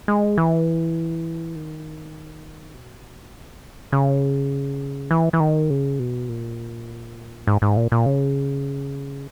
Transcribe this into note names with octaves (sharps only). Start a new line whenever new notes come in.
G#3
E3
D#3
B2
C#3
E3
E3
D#3
C#3
B2
A#2
G#2
G#2
A#2
A#2
C#3